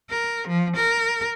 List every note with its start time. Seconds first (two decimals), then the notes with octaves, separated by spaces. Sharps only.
0.10 A#4
0.48 F3
0.76 A#4